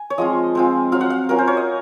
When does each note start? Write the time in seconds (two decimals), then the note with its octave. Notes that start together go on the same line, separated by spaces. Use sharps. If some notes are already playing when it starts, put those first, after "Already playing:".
Already playing: G#5
0.10 C#5
0.18 F3 G#3 C4 F4 D#5
0.55 G#3 C4 F4
0.92 F#3 C4 F4 F5
1.01 F#5
1.10 F5
1.29 F#3 C#4 F4 A#4
1.38 C5
1.47 C#5
1.57 D#5